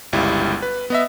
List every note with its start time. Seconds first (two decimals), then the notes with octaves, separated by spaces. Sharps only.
0.13 G1 C#2 G3 E4 F5
0.62 B4
0.90 B3 D#5 E5